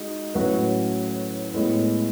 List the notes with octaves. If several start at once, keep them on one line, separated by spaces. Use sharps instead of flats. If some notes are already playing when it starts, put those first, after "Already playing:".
Already playing: G#3 D#4 F#4
A2 F#3 C#4 F#4 B4
A2 G#3 B3